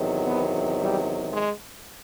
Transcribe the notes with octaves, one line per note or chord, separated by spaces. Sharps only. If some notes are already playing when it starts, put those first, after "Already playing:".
Already playing: E2 C3 D#3 F#3
B3
G3
G#3